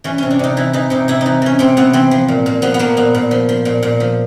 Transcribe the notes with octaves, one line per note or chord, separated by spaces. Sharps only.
E3 C#4
C3 C#4
D4
C3 D#4
E3 E4
E3 D#4
C3 D#4
C3 E4
E3 D#4
E3 C#4
C3 C4
C3 B3
E3 C4
F3
A#2
A#2
F3 B3
B3
F3 A#3
A#2 B3
A#2
F3
F3
A#2
A#2
F3